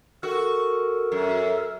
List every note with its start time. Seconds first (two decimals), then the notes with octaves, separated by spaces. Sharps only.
0.23 F#4 A4 A#4
1.12 F#2